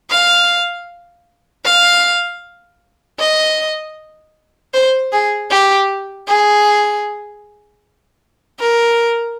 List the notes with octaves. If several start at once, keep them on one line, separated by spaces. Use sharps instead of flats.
F5
F5
D#5
C5
G#4
G4
G#4
A#4